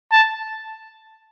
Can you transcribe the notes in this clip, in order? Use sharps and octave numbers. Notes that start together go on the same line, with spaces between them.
A5